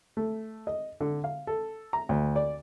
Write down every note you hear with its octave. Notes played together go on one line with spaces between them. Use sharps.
A3
D#5
D3
F5
A4
A#5
D2
D5